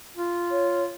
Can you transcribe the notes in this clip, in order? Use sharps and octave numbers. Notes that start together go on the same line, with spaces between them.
F4
C#5